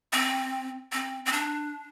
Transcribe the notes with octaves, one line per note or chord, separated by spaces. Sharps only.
C4
C4
C4
D4